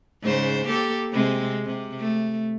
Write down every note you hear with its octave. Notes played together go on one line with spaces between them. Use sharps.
G#2 C#3 C5
A#3 G4 A4
C3 G#3 C4
C3
A3